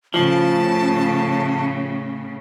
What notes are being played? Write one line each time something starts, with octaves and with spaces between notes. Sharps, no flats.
A2 C#3 F3 A5